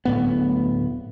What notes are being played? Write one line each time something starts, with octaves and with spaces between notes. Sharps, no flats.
D1 A2 B3